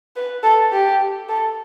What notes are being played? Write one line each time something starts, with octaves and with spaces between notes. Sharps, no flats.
B4
A4
G4
A4